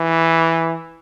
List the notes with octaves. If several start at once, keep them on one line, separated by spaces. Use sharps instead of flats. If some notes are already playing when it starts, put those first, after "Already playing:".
Already playing: E3